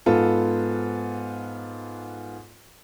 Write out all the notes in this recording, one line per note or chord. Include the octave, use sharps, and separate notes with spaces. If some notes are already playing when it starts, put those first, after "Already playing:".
G#2 B3 F4 A4